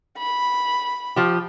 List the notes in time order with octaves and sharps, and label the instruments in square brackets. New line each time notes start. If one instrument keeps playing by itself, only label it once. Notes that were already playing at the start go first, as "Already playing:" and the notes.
[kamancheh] B5
[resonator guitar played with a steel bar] F3 G4